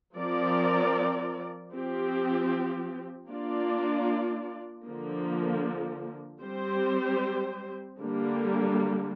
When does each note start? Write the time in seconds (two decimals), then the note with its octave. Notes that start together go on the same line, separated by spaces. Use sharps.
0.15 F3 C4 A#4 D5
1.72 F3 C4 G4
3.28 A#3 D4 F4 D5
4.86 D3 F3 A#3
6.42 G3 C4 G4 C5
7.98 D3 G3 A#3